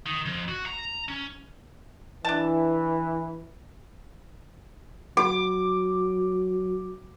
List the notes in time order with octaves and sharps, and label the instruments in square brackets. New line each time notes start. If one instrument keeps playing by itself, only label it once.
[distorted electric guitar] D#3
F2
F#4
A#5
C#4
[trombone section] E3 [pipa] D4 A5
[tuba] F#3 [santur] D6